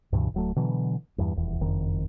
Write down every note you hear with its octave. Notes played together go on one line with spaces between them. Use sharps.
C#2 G2 B2 E3
D1 F#3 A3
B2 D3 E3 F#3
E2 G2
D#1 E2
F#1 F2 D#3